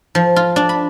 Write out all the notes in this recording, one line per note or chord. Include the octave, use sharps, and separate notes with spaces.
F3
F4
D4
B5